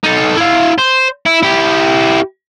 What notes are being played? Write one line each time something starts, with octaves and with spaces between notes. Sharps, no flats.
D#4 A4
E4 F5
C5
E4
E4 G4